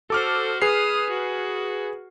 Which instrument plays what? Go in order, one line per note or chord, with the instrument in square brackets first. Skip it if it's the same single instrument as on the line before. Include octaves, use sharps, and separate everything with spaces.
[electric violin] F#4 C5 [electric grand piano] A4 D6 F6
[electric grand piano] G#4 B4 C7 [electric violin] D#6 F6
[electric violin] F#4